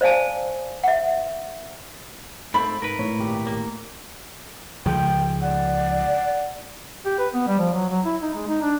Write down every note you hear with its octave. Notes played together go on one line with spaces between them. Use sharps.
C5 D5 F5 G#5 A5
E5 F#5
G#2 A3 C4 B5
G#2 A#4 B4
A2 C#5
G#1 A#2 G4
A#3
C#2 F3 G5
D5 F#5
G4
B4
B3
G3
F3
F#3
F#3
E4
D#4
G#3
D#4
D4